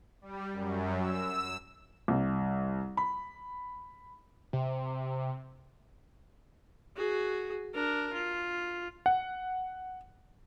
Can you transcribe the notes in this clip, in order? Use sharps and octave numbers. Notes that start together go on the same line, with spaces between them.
G3
F#2
E6
C2
B5
C3
F#4 G#4
D4 A#4
F4
F#5